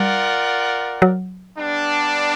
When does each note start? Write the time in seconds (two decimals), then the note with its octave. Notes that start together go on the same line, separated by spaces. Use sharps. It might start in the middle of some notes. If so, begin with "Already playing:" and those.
Already playing: G3 F4 A#4 D5 F#5
1.02 F#3
1.58 G3 B3 D4